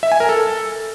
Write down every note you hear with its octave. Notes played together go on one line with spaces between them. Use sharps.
E5
G#5
A#4
A4